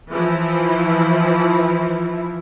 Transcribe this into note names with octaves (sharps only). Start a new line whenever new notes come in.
E3 F3 E4